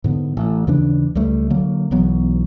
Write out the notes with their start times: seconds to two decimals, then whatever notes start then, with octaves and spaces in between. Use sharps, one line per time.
0.04 G#2 D3 B3
0.37 A1
0.67 D#2 C#3 E3 D4
1.15 C#2 G3 A3
1.50 D3 F#3 A#3
1.91 B1 E3 F#3 B3